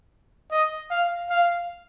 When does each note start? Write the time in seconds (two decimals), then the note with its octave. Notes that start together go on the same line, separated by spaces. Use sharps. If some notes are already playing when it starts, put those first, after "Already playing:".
0.52 D#5
0.91 F5
1.30 F5